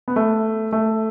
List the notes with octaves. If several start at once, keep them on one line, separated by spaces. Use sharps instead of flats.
B3
A3
A3